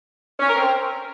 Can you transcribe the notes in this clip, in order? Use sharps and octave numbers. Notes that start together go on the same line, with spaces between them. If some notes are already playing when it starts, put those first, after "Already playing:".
C#4
A#4
C4